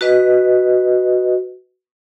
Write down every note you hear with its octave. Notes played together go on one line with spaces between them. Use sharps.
F#4 B4 D#5